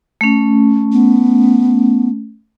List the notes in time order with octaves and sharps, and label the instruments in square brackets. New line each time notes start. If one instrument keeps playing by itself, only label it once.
[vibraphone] A3 C#4
[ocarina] B3